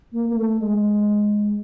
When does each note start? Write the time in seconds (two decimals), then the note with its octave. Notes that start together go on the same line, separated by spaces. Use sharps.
0.12 A#3
0.29 A#3
0.35 A3
0.59 G#3